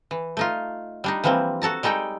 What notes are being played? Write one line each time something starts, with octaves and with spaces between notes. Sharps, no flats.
E3
A3 D#4 F4
G3 D4 D#4
E3 F3 G3 A#3 C4
F#4 A4 A5 A#5
G3 G#3 D#4 A4 G5